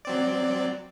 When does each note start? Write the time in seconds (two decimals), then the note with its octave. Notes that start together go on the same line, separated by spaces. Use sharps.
0.05 F#3 C4 D5